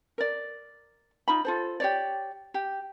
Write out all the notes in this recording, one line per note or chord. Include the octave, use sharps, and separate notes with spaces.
A#4 D5
D#4 F4 B5
F4 A4 C5
G4 C#5 D5
G4